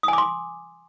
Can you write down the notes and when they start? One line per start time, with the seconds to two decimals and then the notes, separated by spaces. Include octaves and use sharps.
0.03 D#6
0.08 G#5
0.13 D6
0.18 C6